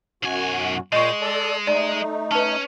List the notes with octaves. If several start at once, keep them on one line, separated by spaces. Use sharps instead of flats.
B1 F#2 F#4 G#5
A#2 G#3 D#5 C6 C#6 G6
A4 D5 A5
A3 D#4 D5
C#4 B4 A5